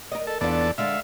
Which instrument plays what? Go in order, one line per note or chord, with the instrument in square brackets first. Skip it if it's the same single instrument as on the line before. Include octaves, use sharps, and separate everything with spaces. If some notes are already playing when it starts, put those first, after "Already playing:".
[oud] A#4 D#5
[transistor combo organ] A4
[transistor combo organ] E2 A4 D5 [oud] B3 D4 F4
[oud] D3 G#3 F4 [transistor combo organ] E5 F5